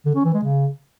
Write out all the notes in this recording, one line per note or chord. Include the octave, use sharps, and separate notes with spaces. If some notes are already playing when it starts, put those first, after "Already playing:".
D3
C#4
E3
G#3
C#3